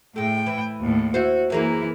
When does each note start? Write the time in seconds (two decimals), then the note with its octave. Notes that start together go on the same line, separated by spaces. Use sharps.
0.16 A2 G#3 A3 G5
0.46 E3
0.81 D#2 A2
1.14 E4 F#4 C5
1.50 F#2 E3 A#3 E4 G#4